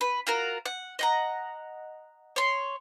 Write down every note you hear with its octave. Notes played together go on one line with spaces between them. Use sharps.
B4
F4 F#4 A#4
F#5
D#5 F#5 A#5
C#5 C6